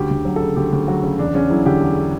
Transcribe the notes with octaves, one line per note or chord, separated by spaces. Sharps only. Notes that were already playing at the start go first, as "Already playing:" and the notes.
Already playing: D2 C#3 G4
D2
F#3
A4
C#3
D2 G4
D2
F#3 F#4
C#3
E2 D4
E2 C#4
F#3 E4
D3 G4
E2